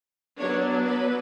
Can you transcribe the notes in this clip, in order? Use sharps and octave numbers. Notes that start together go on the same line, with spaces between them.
F#3 B3 D4 C#5
B4